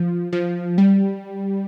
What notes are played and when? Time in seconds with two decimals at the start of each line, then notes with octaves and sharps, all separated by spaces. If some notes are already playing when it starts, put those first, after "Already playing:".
Already playing: F3
0.33 F3
0.78 G3